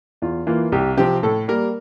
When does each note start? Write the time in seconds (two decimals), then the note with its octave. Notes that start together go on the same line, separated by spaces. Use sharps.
0.22 E2 F4
0.47 E3 A#3 F4
0.72 C2 G4
0.97 C3 F3 C4 G4
1.23 A2 A4
1.48 G3 A#3 A#4